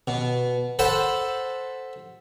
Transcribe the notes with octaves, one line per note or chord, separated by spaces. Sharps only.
B2
A4 C5 F#5 A5 B5